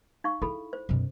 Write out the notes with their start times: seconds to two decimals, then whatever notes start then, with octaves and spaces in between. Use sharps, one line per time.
0.24 D#4 F5 C#6
0.42 E4 G#4 A4 B5
0.73 C5
0.89 F#2 B2